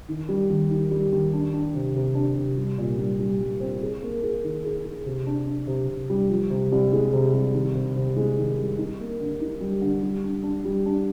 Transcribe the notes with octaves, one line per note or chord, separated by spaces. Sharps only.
D#3
G3
D#2
D#3
G3
D#2
D4
D4
C3
C3
D4
C3
G3
A#2
G3
G3
G3
C4
G#4
A#3
G#4
D#3
G#4
G#4
C3
D4
D4
C3
C3
G3
F3
C3
C2
G#3
C3
C2
D#3
C3
C3
G#3
D#3
C2
D#4
A#3
D3
D#4
G3
D3
G3
D4
D4
G3
D4